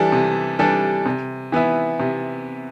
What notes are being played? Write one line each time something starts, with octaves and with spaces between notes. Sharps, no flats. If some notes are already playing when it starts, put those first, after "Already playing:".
Already playing: E3 G3 D4 A4
C3
E3 G3 D4 A4
C3
E3 B3 E4
C3